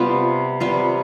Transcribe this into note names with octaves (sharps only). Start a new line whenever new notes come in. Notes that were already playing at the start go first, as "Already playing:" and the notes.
Already playing: C3 G3 B3 F4
C3 G3 B3 F4